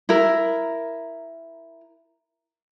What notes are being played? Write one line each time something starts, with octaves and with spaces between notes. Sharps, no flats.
E4 A#4